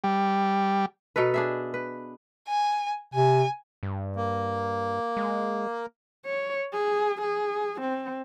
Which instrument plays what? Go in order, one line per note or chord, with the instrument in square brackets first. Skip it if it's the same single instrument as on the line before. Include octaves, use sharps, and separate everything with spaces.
[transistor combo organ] G3
[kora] B2 D#4 A4 B4
D4 G#4 E5
B4
[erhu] G#5
[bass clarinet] C3 [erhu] G#5
[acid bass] G2
[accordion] A#3
[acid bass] G#3
[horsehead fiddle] C#5
G#4
G#4
C4